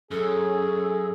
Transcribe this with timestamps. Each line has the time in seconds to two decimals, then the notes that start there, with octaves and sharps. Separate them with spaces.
0.11 F#2 C#4 G#4 A4